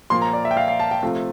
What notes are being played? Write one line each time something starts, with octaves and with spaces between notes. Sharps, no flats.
A#2 F3 A#3 C6
A#5
D5
E5
G5
F5
F5
A5
G5
C3 F3 A3 F5